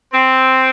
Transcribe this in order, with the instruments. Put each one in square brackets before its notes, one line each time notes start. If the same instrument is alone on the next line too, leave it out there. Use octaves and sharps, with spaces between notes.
[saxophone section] C4